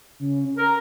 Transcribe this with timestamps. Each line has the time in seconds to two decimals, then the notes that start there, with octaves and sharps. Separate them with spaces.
0.19 C#3
0.57 A#4 A#5